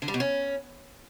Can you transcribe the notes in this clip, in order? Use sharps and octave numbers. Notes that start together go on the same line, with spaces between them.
D3
G3
B2
C#4